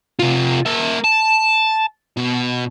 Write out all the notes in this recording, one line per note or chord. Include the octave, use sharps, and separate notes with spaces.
C3 F4
A#3 E5
A5
B2